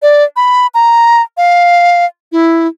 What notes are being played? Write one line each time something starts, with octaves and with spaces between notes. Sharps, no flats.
D5
B5
A#5
F5
E4